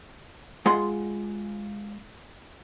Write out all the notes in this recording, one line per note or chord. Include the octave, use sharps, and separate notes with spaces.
G#3 F4 F#5 C6